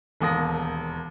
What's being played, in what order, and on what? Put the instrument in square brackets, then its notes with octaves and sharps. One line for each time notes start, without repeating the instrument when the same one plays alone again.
[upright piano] E1 D#2 D#6 A#6